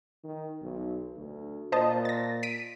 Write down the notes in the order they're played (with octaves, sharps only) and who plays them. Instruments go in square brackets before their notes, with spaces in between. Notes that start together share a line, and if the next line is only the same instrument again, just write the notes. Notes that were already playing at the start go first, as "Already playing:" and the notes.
[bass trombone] D#3
B1
D2
[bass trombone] A#2 [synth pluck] C5 D#5 A5
[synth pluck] A6 A#6
B6 D7 D#7